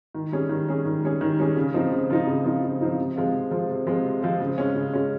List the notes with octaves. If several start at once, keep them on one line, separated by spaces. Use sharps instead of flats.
D#3
G3 C#4 G#4
D#3
G3 C#4 G#4
D#3
G3 C#4 G#4
D#3
G3 C#4 G#4
C#3
F3 C4 D#4
C#3
F3 C4 D#4
C#3
F3 C4 D#4
C#3
F3 C4 D#4
C3
F3 G#3 C4 F4
C3
F3 G#3 C4 F4
C3
F3 G#3 C4 F4
C3
F3 G#3 C4 F4
C#3
G#3 C#4
C#3
G#3 C#4